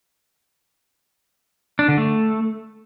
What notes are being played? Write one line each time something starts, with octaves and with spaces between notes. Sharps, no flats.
D4
D3
A3